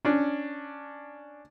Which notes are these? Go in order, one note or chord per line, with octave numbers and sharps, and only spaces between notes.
C#4 D4